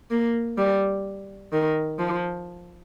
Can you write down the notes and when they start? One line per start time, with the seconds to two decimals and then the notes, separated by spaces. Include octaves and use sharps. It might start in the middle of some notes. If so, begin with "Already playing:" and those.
0.10 A#3
0.57 G3
1.52 D#3
1.98 F3